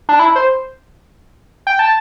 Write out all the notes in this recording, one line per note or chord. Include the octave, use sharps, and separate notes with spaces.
D4
E4
C5
G5
A5